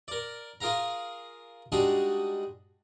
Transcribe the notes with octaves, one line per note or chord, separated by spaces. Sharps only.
A#4 D5
F4 G#4 A#4 F5 A#5
G3 G#3 D4 D#4 F#4 G#4